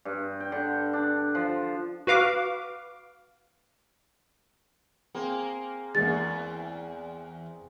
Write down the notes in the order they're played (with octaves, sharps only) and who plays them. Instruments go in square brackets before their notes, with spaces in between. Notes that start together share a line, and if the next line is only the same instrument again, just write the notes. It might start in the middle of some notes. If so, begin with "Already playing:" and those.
[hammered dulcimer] G2
G5
D3
D4
F3
[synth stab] F#4 B4 F5 D6
[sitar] A#3 [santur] C4 G#4
[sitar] E2 [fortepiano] G#3 A#3 [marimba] A6